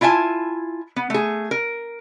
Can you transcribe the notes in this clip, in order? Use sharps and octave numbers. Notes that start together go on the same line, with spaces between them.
E4 F4 E5 G#5 A5
B3
A3 G#4
A#4